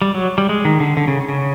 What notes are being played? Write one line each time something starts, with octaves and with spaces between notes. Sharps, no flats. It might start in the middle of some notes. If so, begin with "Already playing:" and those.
G3
F#3
G3
G#3
D#3
D3
D3
C#3
C#3